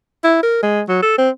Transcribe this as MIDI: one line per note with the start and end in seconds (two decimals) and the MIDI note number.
0.24 0.38 64
0.43 0.62 70
0.63 0.81 56
0.89 0.98 54
1.02 1.17 69
1.18 1.30 60